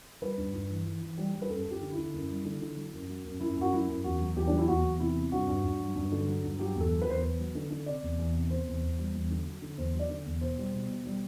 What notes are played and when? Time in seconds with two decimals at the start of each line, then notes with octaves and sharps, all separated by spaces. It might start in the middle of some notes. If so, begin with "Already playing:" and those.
0.22 G3 B4
0.37 G2
0.54 G2
0.70 E3
0.85 E3
1.02 E3
1.18 G3
1.34 G3
1.42 B4
1.49 F#2 A4
1.66 F#2
1.71 G4
1.81 D3
1.92 E4
1.97 D3
2.14 F#2
2.29 G3
2.44 D3
2.61 D3
2.76 F#3
2.93 F#2
3.08 F#3
3.25 F#2
3.40 F#2 E4
3.56 F#2 F#4
3.72 F#3 E4
3.88 F#2
4.04 E2 F#4
4.20 F#3
4.36 E2 G4
4.47 F#3 D4
4.58 E4
4.68 E2 F#4
4.84 E2
5.00 C3 E4
5.16 C3
5.32 G2 F#4
5.48 G2
5.64 G2
5.80 F#3
5.96 G2
6.12 D3
6.28 F#3
6.44 G2
6.59 F#3 G4
6.75 E2
6.80 A4
6.91 F#3
7.02 B4
7.08 E2 C5
7.17 B4
7.23 E2
7.39 F#3
7.55 D3
7.71 D3
7.86 C3 D5
8.02 E2
8.18 E2
8.35 C3
8.50 C3 C5
8.67 E2
8.83 E2
8.98 G3
9.14 E2
9.30 D3
9.45 F#3
9.62 D3
9.78 E2 C5
9.94 F#3
9.99 D5
10.10 D3
10.26 E2
10.41 B2 C5
10.58 G3
10.74 B2
10.89 B2
11.06 G3